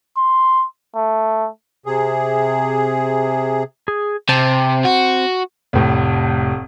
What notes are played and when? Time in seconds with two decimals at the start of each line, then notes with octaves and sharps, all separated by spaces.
0.18 C6
0.96 A3
1.86 C3 G#4
3.88 G#4
4.29 C3 C4 C5 A5
4.85 F#4
5.73 F1 A2